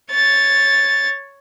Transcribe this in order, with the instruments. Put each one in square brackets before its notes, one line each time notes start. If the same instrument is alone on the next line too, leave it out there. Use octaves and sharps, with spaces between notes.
[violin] C#5 A6